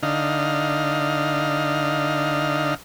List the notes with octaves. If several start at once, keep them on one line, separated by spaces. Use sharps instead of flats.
D3 D#4 F5